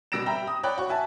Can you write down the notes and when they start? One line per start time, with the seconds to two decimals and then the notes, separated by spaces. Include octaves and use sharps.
0.12 B2 G3 E6 A#6 D7 E7
0.26 E5 G5 A#5 B5
0.47 D#6
0.63 C#5 D5 G5 B5 F#6
0.78 F#4 C#6
0.89 E5 G#5 A5